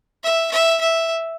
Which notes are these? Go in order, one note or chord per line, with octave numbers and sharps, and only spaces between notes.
E5
E5
E5